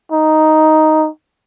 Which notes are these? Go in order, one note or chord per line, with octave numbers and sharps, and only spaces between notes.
D#4